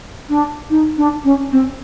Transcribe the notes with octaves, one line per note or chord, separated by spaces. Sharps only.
D4
D#4
D4
C#4
C4